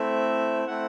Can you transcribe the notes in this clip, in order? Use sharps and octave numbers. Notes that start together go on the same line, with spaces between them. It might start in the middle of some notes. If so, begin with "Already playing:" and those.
Already playing: A3 C4 E4 E5
A3 C4 E4 F#5